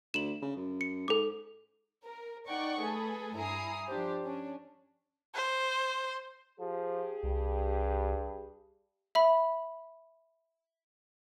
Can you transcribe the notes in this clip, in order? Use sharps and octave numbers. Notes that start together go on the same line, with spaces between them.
D2 E7 F#7
C#3
F#2
C#7
G#2 A4 D6
A#4
D#4 D5 F#5 G5 C#6
A3 G#4 A4 B4
G2 E4 G#5 A#5 D#6 C7
F3 D4 G4 C5
C#4 D4
C5
F3 G4 G#4
C2 G2
E5 B5